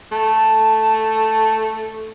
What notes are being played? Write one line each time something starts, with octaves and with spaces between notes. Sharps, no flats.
A3 A5